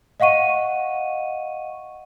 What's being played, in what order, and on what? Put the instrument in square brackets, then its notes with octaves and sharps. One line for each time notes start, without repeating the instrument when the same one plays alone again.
[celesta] D#5 F5 F#5 C#6 D#7